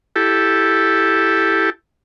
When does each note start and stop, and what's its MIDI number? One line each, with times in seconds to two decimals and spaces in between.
0.16 1.70 64
0.16 1.70 67
0.16 1.70 69